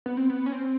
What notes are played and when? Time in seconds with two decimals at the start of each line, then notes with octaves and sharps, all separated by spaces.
0.06 B3
0.17 C4
0.30 B3
0.46 C#4
0.52 C4